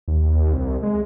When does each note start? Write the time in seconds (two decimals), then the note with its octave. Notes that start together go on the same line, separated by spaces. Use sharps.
0.08 D#2
0.53 C2
0.83 G#3